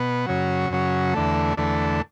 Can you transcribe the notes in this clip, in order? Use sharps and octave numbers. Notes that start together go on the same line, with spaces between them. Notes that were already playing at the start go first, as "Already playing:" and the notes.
Already playing: B2 B3
F#2 C#3 F#3
F#2 C#3 F#3
E2 D3 A3
E2 D3 A3